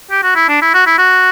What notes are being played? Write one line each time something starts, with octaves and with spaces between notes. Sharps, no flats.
G4
F#4
E4
D4
E4
F#4
E4
F#4